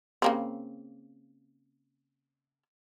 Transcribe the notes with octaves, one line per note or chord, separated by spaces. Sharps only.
C#3 A#3 C4